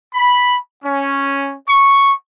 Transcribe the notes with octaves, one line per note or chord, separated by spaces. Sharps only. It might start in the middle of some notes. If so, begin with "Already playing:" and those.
B5
C#4
C#6